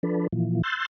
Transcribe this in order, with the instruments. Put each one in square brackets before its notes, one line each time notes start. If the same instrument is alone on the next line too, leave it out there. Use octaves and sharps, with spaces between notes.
[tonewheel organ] F3 D4 A4 B4
A#2 E3 F3
C6 E6 F#6 G6 A6